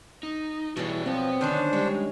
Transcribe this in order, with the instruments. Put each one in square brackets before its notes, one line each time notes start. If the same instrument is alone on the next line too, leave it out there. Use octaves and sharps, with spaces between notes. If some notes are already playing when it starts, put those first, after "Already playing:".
[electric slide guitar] D#4
[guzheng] B2 G3 [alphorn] E3 [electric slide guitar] F#4 G#4 C#5
[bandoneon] F3 [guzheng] F#3 [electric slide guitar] B3 B4 [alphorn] C4
[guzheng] D3 D#3 C#4 [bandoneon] D4 C5
[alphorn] G3 [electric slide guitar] G#3 [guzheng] C#5